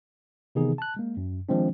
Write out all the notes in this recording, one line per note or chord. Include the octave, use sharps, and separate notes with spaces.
C3 D#3 E3 B3 D#4 G#4
A5 F#6
G#3 A#3
F#2
D#3 F3 G#3 C4 D4